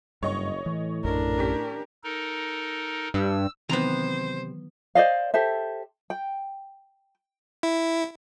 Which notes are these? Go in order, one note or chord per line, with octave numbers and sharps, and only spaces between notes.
F#1 G2 C#5 D#5 C#6
A2 E3
A#1 F#2 D4 A#4
C#4 G4 B6
D#4 A4 A#4
G2 E6
C3 D#3 E3 F#3 B3 C5 A#5
C5 D5 D#5 F5
G4 A4 C5 E5
G5
E4